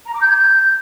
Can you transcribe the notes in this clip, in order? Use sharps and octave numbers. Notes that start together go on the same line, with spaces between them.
A#5
D6
G6
G#6
G6